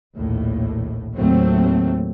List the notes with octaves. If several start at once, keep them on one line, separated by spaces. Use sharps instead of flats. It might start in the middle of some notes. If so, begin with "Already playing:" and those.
A#1 D#2 A2
D#2 A2 F#3 A3 C4